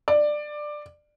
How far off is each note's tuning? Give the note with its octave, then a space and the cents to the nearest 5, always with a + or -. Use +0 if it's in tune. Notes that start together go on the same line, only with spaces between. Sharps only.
D5 +15